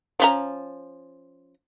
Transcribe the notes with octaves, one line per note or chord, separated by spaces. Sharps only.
F3 C#4 A#5